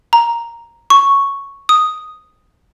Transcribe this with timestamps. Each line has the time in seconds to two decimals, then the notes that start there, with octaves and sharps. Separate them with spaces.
0.13 A#5
0.90 C#6
1.69 D#6